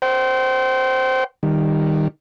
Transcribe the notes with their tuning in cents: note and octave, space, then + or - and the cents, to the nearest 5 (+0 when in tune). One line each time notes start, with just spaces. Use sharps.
C5 +0 G5 -35
D#3 -10 G3 +10